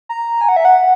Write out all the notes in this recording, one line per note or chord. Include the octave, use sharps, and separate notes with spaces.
A#5
G#5
F#5
E5
F#5